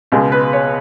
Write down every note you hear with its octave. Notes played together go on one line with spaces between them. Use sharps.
C#2 B2 G#3
B4
C#5